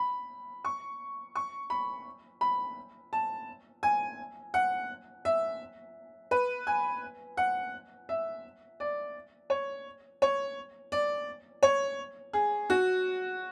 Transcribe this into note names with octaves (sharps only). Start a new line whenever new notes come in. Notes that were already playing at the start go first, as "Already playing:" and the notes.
Already playing: B5
C#6
C#6
B5
B5
A5
G#5
F#5
E5
B4
G#5
F#5
E5
D5
C#5
C#5
D5
C#5
G#4
F#4